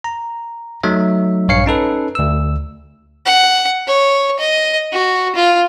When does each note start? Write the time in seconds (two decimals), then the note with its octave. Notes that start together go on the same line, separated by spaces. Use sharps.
0.04 A#5
0.83 F#3 A3 D#4 E5
1.48 A#1 G2 C#5 F5 C7 C#7
1.66 C#4 D#4 A4 B4
2.15 D2 E6
3.26 F#5
3.88 C#5
4.39 D#5
4.93 F#4
5.36 F4